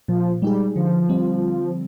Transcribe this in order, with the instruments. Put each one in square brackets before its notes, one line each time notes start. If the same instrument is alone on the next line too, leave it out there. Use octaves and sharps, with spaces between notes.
[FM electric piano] A#2 [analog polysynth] F3
[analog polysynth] G3 [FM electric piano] G#3 D#4 G#4
[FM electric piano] D3 [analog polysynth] F3
[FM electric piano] G3 C4